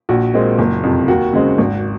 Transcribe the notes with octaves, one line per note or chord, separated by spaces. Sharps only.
A#1 F#4
A#2 G#3 C4
F#1
F2 C3
D#2 F#4
C#3 G#3 C4
G#1